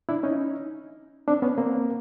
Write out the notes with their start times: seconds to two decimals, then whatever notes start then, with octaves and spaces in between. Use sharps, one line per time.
0.09 D4 E4
0.23 C#4 D#4
1.28 C4 D4
1.42 B3 C#4
1.58 A#3 C4